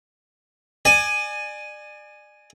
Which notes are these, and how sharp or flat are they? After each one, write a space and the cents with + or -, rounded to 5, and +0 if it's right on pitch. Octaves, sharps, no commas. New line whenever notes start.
D5 +35 G#5 +0